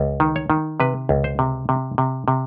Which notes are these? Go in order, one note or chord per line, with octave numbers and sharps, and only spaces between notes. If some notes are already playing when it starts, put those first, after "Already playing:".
Already playing: C#2
D#3
C#5
D#3
C3 B4
C#2
C5
C3
C3
C3
C3